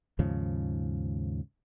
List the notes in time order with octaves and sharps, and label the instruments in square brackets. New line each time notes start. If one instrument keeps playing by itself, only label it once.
[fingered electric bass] D#2 G#2 C#3 F3